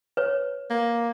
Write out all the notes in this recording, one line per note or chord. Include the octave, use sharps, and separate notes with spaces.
B4 C#5
A#3